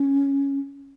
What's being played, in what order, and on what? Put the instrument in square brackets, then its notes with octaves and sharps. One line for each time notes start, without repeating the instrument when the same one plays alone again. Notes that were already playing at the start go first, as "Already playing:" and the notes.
Already playing: [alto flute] C#4